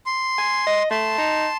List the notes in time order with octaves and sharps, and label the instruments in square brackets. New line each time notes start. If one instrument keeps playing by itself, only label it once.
[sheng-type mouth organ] C6
[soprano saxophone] G#5
D#5
[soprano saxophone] A3 [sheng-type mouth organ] A5 C6
[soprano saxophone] D#4